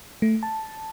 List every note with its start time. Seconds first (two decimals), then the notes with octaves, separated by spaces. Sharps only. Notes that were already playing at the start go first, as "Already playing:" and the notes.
0.22 A3
0.43 A5